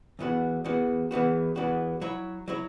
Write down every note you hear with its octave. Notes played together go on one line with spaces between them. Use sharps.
E2 E3 B3 F#4
E2 E3 B3 F#4
E2 E3 B3 F#4
E2 E3 B3 F#4
F#3 E4 C#5
F#3 E4 C#5